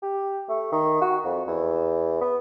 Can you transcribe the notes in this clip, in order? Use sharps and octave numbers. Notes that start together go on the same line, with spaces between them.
G4
A3
D#3
F#4
F2
E2
B3